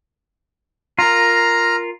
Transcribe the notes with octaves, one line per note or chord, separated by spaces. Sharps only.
F4 A#4 A#5 F6